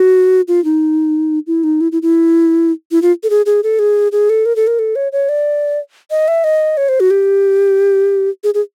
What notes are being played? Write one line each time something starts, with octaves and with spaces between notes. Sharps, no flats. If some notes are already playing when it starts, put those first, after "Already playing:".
Already playing: F#4
F4
D#4
E4
D#4
E4
E4
E4
E4
F4
A4
G#4
G#4
A4
G#4
G#4
A4
A#4
A4
A#4
A4
C#5
C#5
D5
D#5
E5
D#5
C#5
C5
F#4
G4
G#4
G#4